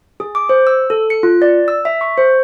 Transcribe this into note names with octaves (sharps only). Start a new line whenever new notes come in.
G#4
D6
C5
E6
A4
C#7
F4
D5
E6
E5
C#6
C5